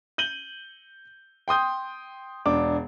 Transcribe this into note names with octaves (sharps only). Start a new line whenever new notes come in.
G6 D#7 F#7 G7
G5 C6 D#6 G6
E1 D4 D6